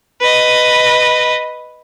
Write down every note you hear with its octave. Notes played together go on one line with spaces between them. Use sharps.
B4 D#5